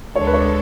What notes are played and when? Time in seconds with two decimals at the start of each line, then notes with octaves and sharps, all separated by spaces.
0.15 D2 D3 G#3 D4 A4 C#5
0.27 B4
0.34 C#5